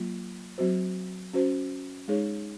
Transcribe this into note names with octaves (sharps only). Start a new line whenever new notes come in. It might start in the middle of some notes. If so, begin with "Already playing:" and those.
Already playing: F#3 A#3 F4
F#3 C4 F#4 C5
C#4 F#4 C5
G#3 D#4 G#4 C#5